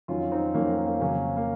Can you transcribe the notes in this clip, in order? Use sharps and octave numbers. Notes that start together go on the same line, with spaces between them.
F2 D#3 F#3 C#4 F4
C4 D#4
F2 D#3 F#3 A#3 C#4
A#3
A#3
F2 C#3 F#3 A#3 C#4
A#3